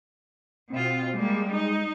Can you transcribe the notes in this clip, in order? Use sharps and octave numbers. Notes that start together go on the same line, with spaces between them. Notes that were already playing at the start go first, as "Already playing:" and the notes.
B2 C4 F4
G3 G#3 A#3
D#4